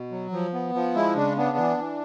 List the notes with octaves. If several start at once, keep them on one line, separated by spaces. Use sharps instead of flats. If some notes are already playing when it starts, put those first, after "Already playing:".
Already playing: B2
F#3
F3
B3
F3
G#3 E4
C#3 D4
B3 D4
E3
E3